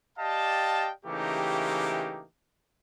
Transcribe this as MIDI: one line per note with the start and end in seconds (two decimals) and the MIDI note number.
0.19 0.90 67
0.19 0.90 74
0.19 0.90 75
0.19 0.90 77
0.19 0.90 79
0.19 0.90 81
1.05 2.24 49
1.05 2.24 52
1.05 2.24 57
1.05 2.24 58
1.05 2.24 63
1.05 2.24 67